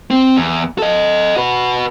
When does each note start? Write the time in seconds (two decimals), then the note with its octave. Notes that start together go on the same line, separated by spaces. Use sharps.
0.11 C4
0.36 E2
0.78 A4 D#5
1.37 F#4 B4